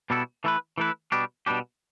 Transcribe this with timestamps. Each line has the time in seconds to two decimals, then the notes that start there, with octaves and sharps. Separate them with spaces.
0.10 B2 G3 B3 E4 A4
0.44 E3 A3 E4 B4
0.78 E3 A3 E4 B4
1.12 B2 G3 D4 G4
1.46 B2 G3 D4 G4